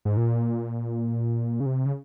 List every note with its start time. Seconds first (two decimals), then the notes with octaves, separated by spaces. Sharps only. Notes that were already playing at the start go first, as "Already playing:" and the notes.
0.05 G#2
0.17 A#2
1.60 C#3
1.66 C3
1.86 C#3